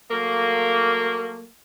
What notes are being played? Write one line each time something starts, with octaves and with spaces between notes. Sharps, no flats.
F#3 A3 A#3